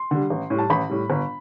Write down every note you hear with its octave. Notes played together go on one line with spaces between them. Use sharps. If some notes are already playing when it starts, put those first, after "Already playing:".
Already playing: C6
D3 G3
A1
A2 G3
A5
A1 B5
A2 G3
G1